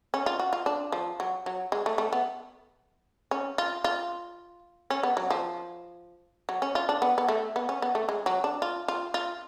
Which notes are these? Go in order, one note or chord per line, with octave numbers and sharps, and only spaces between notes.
C#4
F4
F#4
F4
D4
F3
F#3
F#3
G#3
A3
A3
B3
C#4
F4
F4
C#4
B3
F#3
F3
F#3
C#4
F4
D4
B3
B3
A3
B3
C#4
B3
A3
G#3
F#3
D4
F4
F4
F4